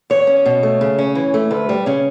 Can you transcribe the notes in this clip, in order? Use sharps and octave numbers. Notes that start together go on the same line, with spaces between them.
E2 C#5
C#4
B2
A3
C#3
C#4
E3
A3
D2 B4
G3
C#3 C#4